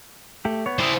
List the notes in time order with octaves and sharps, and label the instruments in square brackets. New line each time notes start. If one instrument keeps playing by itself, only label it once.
[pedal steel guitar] A3 G4
B3 C#5
[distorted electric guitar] E4 C5 [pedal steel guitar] D5 D#6